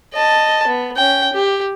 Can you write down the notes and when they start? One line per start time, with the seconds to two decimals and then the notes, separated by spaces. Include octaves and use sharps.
0.13 D#5 A5
0.67 B3
0.96 C#4 G5
1.33 G4